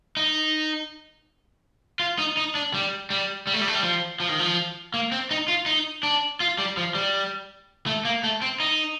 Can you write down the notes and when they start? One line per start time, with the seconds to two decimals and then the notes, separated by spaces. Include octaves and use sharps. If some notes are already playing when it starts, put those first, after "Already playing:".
0.17 D#4
2.00 F4
2.18 D#4
2.37 D#4
2.55 D4
2.74 G3
3.10 G3
3.47 G3
3.54 A3
3.61 G3
3.68 A3
3.75 G3
3.83 F3
4.20 F3
4.29 D#3
4.39 F3
4.94 A#3
5.12 C4
5.31 D#4
5.48 F4
5.66 D#4
6.03 D4
6.40 F4
6.58 G3
6.77 F3
6.95 G3
7.86 A3
8.05 A#3
8.24 A3
8.42 C4
8.60 D#4